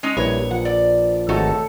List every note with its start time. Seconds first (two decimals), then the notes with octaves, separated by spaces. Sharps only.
0.03 G#3 C#4 D#4
0.17 A#1 G3 E4 B4 C#5 G#6
0.51 F3 F#5
0.65 D5
1.29 G#1 A3 D#4 F#4 A4 C#5